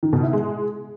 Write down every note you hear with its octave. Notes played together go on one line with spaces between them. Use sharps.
D#3
B2
E4
G#3